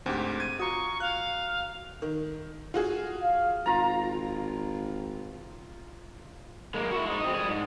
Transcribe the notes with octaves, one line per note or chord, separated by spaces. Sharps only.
D2 G#2 C4 G4
G#6 D#7
F4 F#4 A#5 C#6 D#6
F5 F#6
D#3
F4 F#4 G#4
F5
G#1 F4 A#5
G#3 A#3
E4 F#4
G#3 D#4
C4 D#5
G3 G#4
G#2